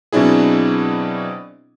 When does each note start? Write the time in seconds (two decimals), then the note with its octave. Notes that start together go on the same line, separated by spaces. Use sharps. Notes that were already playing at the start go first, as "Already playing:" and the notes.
0.12 B2 F#3 C4 D4 E4 G#4